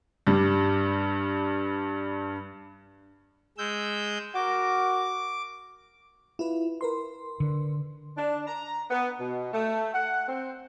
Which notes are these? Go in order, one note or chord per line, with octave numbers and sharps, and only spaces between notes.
G2 G3
G#3 E6 G6
F#4 A#4 D6
E4 F4 B4
A#4 B4 C6
D3
D4
A#5
B3
B2
A3
F#5
C4